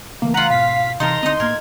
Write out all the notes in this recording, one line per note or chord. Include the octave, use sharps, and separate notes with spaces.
C#3 E3 A3 A#3
F4 B4 F#5 A#5
G#2 B2 F5 B6
C3 E3 D#4 A4 A#4 A#5 C6
D2 F#3 C4 D#4 D#5
A2 A#3 A#4 G#6